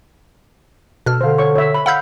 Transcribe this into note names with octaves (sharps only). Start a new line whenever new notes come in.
B2 A4 F6
D3 C5 F5
C#5 C#6
C#5 E5
B5
F5 F#5 B5 E6 G6